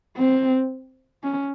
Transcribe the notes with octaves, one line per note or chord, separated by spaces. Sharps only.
C4
C#4